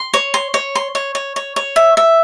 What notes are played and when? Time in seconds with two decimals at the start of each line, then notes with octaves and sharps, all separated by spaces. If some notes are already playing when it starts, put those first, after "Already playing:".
Already playing: C6
0.14 C#5
0.34 C6
0.54 C#5
0.75 C6
0.95 C#5
1.15 C#5
1.36 C#5
1.56 C#5
1.76 E5
1.97 E5